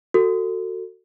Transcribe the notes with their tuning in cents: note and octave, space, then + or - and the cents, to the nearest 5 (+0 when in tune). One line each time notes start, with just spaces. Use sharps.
F#4 +5 A4 +25